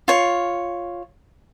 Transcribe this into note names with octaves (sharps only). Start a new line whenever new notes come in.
F4 C#5